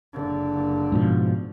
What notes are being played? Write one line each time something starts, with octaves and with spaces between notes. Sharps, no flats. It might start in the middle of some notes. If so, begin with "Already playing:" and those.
F#1 D3
G#2 B2 F3